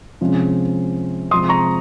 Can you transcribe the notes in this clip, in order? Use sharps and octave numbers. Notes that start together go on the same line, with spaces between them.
C3 F3 G#3 C#4
C3 F3 G#3 C6 D#6
A#5 C#6